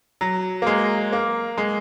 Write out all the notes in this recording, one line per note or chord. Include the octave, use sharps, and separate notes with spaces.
F#3
A#3
G#3
A#3
G#3